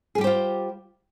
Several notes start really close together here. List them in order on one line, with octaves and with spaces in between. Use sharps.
G#4 G3 G4 C5 F4